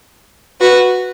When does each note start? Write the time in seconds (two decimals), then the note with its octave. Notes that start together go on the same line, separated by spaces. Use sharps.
0.60 F#4 B4